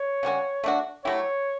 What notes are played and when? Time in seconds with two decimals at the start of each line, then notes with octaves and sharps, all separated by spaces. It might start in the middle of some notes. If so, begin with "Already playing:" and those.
Already playing: C#5
0.23 C#3 G3 C#4 F#4
0.64 A3 D4 F#4
1.04 F#3 A3 E4 G4 C#5